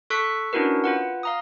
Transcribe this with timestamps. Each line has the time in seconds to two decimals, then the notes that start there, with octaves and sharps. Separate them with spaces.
0.10 A4 C#6 E6 F#6 B6
0.53 C#4 D4 E4 F#4 A#4 B4
0.84 F4 B4 F#5
1.23 F5 A#5 D#6